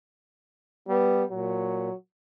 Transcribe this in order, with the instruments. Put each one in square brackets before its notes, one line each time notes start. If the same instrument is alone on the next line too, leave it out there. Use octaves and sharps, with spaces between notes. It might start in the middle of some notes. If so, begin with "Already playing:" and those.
[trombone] G3 [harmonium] B3
[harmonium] A#2 [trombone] F#3